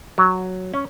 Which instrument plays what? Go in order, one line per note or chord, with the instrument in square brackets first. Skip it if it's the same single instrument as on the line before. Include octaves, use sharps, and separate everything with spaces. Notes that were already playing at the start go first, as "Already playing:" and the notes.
[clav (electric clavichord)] F#3
C#4